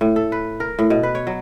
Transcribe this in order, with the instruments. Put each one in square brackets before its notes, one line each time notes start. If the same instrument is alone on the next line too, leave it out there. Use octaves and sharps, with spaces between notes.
[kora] A2
A4
B4
A#4
A2
B2
B4
C#5
F#3